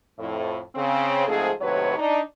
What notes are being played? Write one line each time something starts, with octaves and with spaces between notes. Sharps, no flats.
F2 A2
C#3 C4
G#2 F3 A3 C4 G#4
D#2 A2 C3 F#3 B4 C#5
D4 D#4